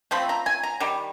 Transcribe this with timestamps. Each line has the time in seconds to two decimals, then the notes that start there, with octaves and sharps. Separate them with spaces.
0.11 F3 A3 C4 B5
0.29 A#5
0.46 G#5
0.63 A#5
0.80 D#3 G3